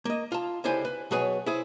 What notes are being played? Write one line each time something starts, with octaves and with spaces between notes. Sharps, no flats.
A#3 D#5
F4 A5
C#2 D3 G3 E4 C5 G#5
B4
B2 F#3 G#4 B4 C#5 G#5
E4 G#4 C5